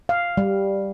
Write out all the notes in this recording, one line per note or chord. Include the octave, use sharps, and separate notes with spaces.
F5
G3